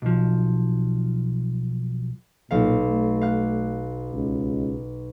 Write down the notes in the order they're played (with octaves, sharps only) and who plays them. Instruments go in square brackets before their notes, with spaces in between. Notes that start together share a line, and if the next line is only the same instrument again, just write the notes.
[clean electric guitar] B1 F3
[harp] B1 F5 [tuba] A#2
[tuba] A3
[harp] F5 F#6
[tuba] C#2